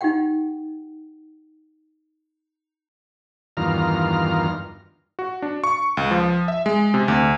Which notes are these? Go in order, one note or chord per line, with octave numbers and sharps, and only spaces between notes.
D#4 F4 G4 F#5 G5
E2 G2 D#3 F4 A#5 F6
F#4
D4
C#6
C#2
F3
E5
G#3
C3
D2